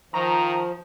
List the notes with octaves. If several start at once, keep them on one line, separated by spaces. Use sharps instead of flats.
D#3 F3 A#5